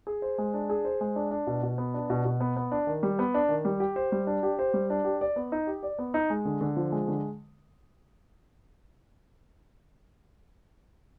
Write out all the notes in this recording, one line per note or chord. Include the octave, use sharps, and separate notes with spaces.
G#4
C5
G#3
D4
G#4
C5
G#3
D4
D4
B2
B2
B3
D4
B2
B2
B3
B3
D4
D#3
G3
B3
D4
D#3
G3
G4
C5
G3
D4
G4
C5
G3
D4
G4
D5
B3
D#4
G4
D5
B3
D#4
G#3
D3
D3
F3
G#3
D3